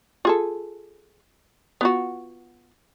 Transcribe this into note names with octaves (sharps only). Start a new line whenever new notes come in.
F4 G#4 A4
B3 F4 F#4